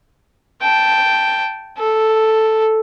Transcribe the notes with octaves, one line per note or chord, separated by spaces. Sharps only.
G5 A5
A4